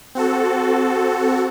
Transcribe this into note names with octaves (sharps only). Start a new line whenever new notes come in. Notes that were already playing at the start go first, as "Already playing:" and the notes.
C4 F#4 A4